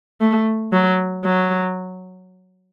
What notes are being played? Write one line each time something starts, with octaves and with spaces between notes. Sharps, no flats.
A3
F#3
F#3